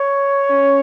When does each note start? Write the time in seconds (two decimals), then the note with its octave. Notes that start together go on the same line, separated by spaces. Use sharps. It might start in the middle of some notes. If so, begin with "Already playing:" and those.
Already playing: C#5
0.51 C#4